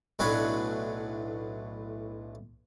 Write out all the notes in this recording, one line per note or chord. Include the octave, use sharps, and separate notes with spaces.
B1 A2 F#3 D4 B4 G#5